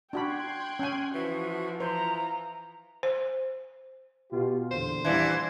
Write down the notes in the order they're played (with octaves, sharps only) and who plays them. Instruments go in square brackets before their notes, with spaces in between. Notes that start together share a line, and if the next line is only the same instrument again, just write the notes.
[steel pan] D4 F#4 B5 [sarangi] G5 [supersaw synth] C6 F#6 G#6
[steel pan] C#4 G#5
[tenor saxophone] E3 [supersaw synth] F3 [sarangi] F#4
[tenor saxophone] E3 [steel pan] C5 [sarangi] A#5
[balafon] C5
[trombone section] B2 F4 G4
[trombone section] E2 A#2 D3 [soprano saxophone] C5
[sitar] A#2 E3 [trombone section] G3 D4 E4